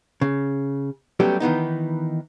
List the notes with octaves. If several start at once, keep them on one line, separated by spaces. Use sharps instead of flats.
C#3
F#3 G3 A3 B3 C#4 G4
D#3 E3 B3 D#4